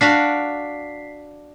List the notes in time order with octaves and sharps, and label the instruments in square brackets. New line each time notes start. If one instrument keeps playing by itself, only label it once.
[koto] D4 F#4 F5 [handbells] B6 C7